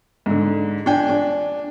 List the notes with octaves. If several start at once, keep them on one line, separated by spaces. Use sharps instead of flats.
G#2 D3
D4 G5 G#5
D4